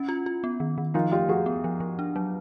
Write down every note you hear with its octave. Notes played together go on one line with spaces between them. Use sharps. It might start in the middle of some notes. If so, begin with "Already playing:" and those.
Already playing: C#4 E4
F4
F4
B3
D#3
D#3
F3 D#4 F4
A3 F4 G4
F3 F#4 G#4
B3
F3
F3
D4
F#3